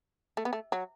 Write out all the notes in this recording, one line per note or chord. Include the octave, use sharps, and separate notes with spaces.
A3
B3
A3
F#3